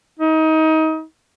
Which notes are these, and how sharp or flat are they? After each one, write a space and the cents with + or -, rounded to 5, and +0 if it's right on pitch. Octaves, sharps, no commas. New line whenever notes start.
D#4 +25